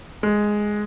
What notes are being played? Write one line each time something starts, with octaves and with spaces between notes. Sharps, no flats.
G#3